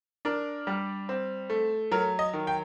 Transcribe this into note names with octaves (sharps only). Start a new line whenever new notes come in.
D4 A#4
G3
C4
A3
F#3 A#4
D#5
D#3
G5